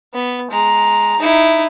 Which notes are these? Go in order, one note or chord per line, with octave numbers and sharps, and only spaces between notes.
B3
G#3 A#5
D#4 E4